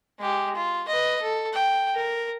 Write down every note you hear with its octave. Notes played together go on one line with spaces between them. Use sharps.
G#3 G4
F4
B4 D#5
A4
G5
A#4